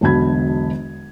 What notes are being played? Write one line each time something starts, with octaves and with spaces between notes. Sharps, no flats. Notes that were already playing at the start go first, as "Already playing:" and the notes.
E1 B1 D3 A5 B5 G#6